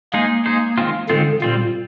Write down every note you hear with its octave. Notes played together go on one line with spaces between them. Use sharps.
G#3 A#3 D#4 G#4 C5
G#3 D#4 G#4 C5
D#3 G#3 C4 F4
D3 D#3 G#3 C4 F4
A#2 G3 C4 F4